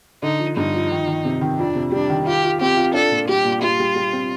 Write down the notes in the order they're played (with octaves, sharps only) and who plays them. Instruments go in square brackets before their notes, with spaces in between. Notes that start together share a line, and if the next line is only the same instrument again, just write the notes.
[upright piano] D3 [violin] D#4
[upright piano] F3
[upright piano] G2 [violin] D#4
[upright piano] F3
D#3
D#3
C3
D#3
[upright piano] F2 [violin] D4
[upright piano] C3
[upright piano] G3 [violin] D4
[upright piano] D#3
[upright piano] F4 [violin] G4
[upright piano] F4
[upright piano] C4 [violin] G4
[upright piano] F4
[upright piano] D4 [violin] A4
[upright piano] A#2
[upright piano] G3 [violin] G4
[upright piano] A#2
[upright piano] G3 [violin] F4
[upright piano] G3
G3
C4